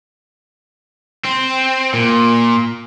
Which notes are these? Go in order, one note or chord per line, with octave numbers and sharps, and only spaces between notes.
C4
A#2